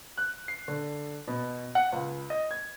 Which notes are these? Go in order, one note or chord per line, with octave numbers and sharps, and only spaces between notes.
F#6
C7
D3
B2
F#5
C#2
D#5
G#6